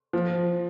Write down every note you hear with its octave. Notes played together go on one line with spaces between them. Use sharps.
F3